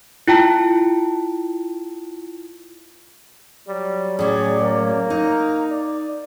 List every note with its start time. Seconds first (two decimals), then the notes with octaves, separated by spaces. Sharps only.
0.28 E4 F4 G5 A5 A#5
3.67 F#3 G3
4.19 A2 C#4 G#4 D5
4.61 A#3
5.10 D#4 A#5
5.70 D5